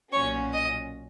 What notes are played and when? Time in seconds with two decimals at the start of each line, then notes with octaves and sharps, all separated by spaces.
0.12 B1 A#2 F#3 C#4 F#4 C#5 C#6
0.53 D#5 D#6